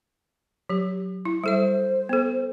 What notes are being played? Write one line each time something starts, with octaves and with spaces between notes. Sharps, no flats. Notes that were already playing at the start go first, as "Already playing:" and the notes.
F#3 G4
E4
G3 A4 C5 E5
B3 A4